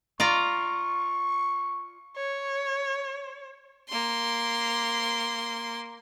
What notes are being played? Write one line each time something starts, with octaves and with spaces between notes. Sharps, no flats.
F4 D5 A#5 C#6
C#5
A#3 C6